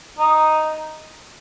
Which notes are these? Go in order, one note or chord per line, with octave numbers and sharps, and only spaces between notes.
D#4 D#5